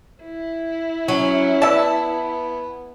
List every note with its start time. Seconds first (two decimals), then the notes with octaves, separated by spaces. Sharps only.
0.23 E4
1.08 F#3 C#4
1.62 B3 D5 E5 A5